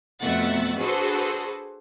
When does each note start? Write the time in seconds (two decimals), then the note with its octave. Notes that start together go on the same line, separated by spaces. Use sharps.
0.20 F2 B2 A3 E5 F#5 A6
0.78 D4 F#4 G#4 A4 B4 C5